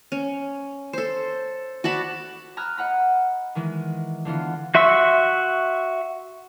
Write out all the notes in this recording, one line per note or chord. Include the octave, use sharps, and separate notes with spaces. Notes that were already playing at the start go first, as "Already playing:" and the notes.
C#4
A4 C5
F#4 D5 A5 B5
A#5 B5 D#6 F6 F#6 G#6
D#5 F#5 A#5 B5
D#3 E3 G#3
D3 E3 B3 F4
F#4 E5 C6 C#6 E6